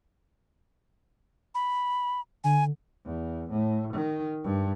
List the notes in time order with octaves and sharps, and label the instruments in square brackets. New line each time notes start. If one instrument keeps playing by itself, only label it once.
[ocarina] B5
[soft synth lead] D3 [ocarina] G#5
[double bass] E2
A2
D#3
G2